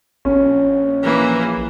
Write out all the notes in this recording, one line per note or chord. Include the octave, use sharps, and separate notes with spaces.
A#1 C#4
E3 A#3